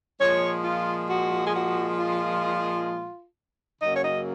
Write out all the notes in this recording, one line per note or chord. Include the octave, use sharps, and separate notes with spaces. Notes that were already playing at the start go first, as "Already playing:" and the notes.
A#2 F3 G#3 C#5
F4
F#4
G#4
F#4
F4
F#2 C#3 F#3 A#3 D#5
C#5
D#5